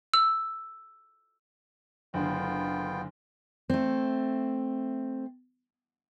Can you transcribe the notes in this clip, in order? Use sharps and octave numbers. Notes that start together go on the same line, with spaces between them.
E6
F#1 D3 B3 F4 G5
A3 C4